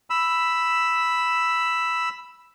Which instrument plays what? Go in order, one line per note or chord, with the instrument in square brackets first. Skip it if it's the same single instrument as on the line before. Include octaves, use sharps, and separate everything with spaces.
[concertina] B5 E6